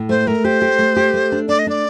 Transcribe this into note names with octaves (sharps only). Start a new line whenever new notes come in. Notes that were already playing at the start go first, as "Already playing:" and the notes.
Already playing: A2
A3 C5
A3 A#4
G4 C5
G4
A3
G4
A3
D4
D4 D5
D#5
D4 D5